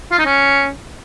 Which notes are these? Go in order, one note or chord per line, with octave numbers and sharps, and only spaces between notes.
F4
D#4
C#4